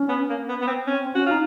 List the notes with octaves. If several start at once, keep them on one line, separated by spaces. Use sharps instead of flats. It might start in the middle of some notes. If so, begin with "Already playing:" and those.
Already playing: C#4
B3
A#3
B3
B3
C4
C4 C#4
C#4 F#4
D#4 F4